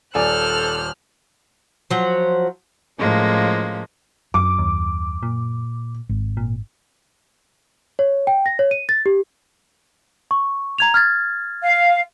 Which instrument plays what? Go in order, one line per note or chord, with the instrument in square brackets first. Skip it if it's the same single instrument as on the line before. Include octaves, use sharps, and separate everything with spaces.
[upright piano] D#1 D5 G#5 [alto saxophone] A4 [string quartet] C5 F6 F#6
[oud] F3 F#3
[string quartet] A2 F3 G#3 A#3 C#4
[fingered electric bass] F#2 [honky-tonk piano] D6
[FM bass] D#2
A#2
[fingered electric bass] G#1
[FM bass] A#2
[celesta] C#5
G5
A#6
C#5
D#7
A6
G4
C#6
A#5 G#6 F7
F6 G#6 A6
[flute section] F5